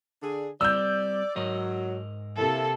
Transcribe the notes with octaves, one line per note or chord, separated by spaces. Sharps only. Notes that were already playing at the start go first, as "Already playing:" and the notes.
D3 D4 G#4
G3 C4 D5 E6 G6
G#2 F#3 A#4 D#5
C3 A#3 E4 A4